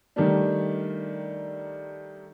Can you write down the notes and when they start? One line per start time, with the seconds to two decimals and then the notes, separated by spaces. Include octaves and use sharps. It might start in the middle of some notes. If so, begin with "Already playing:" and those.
0.16 D#3 G3 A3 D4